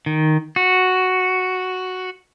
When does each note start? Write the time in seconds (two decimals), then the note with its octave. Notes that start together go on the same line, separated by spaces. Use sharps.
0.06 D#3
0.56 F#4